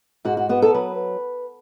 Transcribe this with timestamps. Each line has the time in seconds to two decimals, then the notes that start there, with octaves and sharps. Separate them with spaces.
0.25 G#2 F#4
0.37 F#4
0.49 B3 F#4
0.62 A4
0.74 F#3 B4